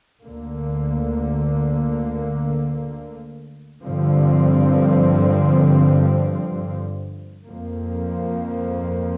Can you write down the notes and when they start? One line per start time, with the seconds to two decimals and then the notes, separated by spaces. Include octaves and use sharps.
0.22 D2 D3 A#3
3.84 G2 D3 F3 C4
7.46 F2 F3 A#3